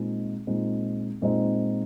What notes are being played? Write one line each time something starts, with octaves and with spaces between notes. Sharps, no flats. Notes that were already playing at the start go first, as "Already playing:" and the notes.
Already playing: A#2 G#3 C4 D#4
A#2 G#3 C4 D#4
A#2 G#3 C4 D#4